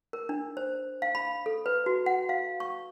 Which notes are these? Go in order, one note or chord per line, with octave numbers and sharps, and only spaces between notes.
A#4
D4
C5
F5
B5
A4
B4
F#4
F#5
F5
C#6